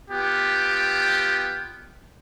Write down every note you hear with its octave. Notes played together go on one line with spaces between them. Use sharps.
B3 F4 G4 G5